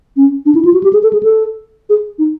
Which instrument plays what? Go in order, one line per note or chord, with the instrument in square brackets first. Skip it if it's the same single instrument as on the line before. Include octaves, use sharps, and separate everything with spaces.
[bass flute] C#4
D4
E4
F4
F#4
G4
G#4
A4
G#4
A4
G#4
D#4